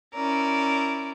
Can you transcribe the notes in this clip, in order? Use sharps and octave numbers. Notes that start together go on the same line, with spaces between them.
C#4 E4 A#4 D5